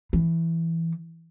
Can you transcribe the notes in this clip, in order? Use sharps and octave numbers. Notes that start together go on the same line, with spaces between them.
E3